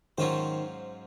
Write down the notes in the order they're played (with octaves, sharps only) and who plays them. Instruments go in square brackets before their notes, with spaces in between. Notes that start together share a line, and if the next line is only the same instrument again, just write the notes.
[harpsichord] G#2 F#3 C#4 F4 C5 [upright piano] D#3